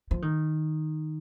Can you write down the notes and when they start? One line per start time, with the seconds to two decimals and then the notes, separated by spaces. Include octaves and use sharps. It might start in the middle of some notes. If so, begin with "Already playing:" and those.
0.11 F3
0.22 D#3